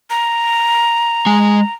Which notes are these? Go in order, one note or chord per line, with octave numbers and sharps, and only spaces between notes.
A#5
G#3 G#5